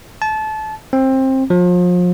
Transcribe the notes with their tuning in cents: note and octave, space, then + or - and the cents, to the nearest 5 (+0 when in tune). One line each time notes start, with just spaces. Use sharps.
A5 -25
C4 +20
F3 +35